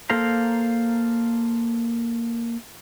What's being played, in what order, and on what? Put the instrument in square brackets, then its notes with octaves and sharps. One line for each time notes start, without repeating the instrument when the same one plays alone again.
[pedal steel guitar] A#3 A4 C5 F5 A#5